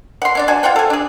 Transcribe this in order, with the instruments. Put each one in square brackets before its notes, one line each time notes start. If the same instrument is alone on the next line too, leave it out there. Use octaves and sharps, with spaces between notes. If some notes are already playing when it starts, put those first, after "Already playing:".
[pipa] F#5 C6
C#4 D4 D5
D4 F#4 G#5
F4 C5 F#5 G5
A4 G#5
D4 G#4